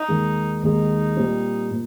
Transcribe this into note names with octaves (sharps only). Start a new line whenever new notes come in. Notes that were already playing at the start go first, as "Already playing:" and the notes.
Already playing: D#4
D#2 D#3 G#3
D#2 D#3 G#3 D#4
A#2 G3 C4
A#2